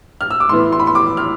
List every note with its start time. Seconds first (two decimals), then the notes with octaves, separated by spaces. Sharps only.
0.21 F6
0.31 E6
0.40 D6
0.49 A2 E3 B3 C6
0.73 C6
0.80 B5
0.87 C6
0.95 D6
1.17 F6